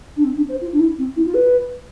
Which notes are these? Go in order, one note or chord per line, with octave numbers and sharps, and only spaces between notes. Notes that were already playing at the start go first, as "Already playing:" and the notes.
D4
C4
D4
C5
F4
D4
E4
C4
E4
F4
B4